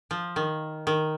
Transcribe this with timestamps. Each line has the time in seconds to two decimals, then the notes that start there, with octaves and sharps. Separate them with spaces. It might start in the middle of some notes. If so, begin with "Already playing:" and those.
0.11 F3
0.36 D#3
0.87 D#3